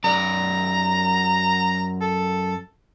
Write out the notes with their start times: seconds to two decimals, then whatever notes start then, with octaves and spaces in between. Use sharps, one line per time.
0.04 F#2 D5 A#5
2.01 A4